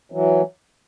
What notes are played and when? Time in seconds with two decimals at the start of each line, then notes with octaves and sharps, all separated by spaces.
0.12 E3 F#3